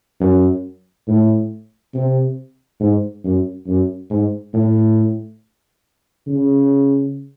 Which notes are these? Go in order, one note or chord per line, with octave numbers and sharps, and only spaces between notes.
F#2
A2
C3
G#2
F#2
F#2
G#2
A2
C#3